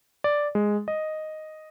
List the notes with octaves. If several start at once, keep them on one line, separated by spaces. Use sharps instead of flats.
D5
G#3
D#5